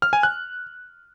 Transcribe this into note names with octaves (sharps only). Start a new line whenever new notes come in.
F6
G#5
F#6